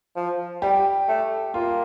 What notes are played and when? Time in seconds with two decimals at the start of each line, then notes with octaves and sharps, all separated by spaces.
0.16 F3
0.62 G3 G4
1.08 A3
1.54 A#3 F4